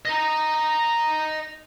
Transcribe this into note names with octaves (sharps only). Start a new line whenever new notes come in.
D#5 A#5